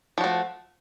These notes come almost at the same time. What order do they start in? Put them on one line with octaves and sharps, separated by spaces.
F3 F#4 A3